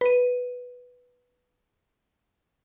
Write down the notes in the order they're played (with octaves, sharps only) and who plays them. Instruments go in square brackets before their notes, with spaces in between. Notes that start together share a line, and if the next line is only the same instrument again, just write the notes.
[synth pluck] B4 D#7